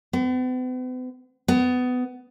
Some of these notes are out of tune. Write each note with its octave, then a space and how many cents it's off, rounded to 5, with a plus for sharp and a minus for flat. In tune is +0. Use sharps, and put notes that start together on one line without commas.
B3 +45
B3 +20